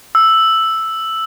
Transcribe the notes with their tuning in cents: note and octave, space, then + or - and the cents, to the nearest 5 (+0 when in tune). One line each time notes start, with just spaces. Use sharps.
E6 +0